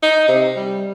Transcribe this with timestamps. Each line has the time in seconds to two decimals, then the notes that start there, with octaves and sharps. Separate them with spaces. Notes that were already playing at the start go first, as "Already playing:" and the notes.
0.03 D#4
0.28 C3
0.56 G3